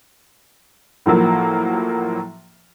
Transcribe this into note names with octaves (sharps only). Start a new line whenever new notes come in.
A2 F3 F#3 A#3